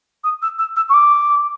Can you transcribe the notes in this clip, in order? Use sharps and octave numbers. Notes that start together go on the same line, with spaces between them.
D#6
E6
E6
E6
C#6
D6